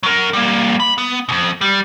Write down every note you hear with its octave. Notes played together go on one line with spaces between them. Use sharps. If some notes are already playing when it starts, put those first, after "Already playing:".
F#3 A#4
G3 A#3
B5
B3
F2 B2
G3